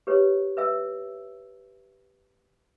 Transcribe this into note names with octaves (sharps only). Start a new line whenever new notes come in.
G4 B4 C#5
B4 E5 E6